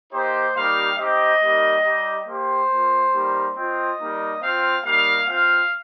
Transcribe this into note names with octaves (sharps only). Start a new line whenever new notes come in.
A#3 D#4 G4 C5
G3 A#3 D#4 G4 F5
C4 D#4 G4 D#5
G3 A#3 D#4 G4
G3 D#4 G4
A#3 G4 C5
A#3 F4
G3 A#3 D#4 G4
C4 F4 D#5
G3 A#3 D#4
C4 F4 F5
G3 A#3 D#4 F5
C4 F4 F5